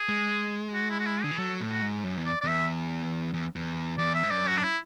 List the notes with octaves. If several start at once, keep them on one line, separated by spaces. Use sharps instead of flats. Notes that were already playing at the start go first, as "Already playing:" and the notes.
Already playing: G#4
G#3
F#4
E4
F#4
E4
D3 G#4
E3
F#3 A4
A2
F#4
G#2
F#2
E2
D5
D5
E2 E5
E2
E2
E2 D5
E5
G#2
F#2 D5
F#4
D4
E4